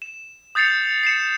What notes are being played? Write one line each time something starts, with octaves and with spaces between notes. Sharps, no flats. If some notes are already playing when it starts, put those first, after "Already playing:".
E7
D#6 G6 A6 C7 C#7 F7
C7 C#7 E7